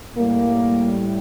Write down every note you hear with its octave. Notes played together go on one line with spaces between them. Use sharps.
A2 G3 A#3